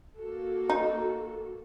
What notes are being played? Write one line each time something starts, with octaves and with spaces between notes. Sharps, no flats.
A#3 F#4 A4
D#4